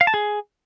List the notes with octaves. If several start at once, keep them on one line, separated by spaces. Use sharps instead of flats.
F5
A5
G#4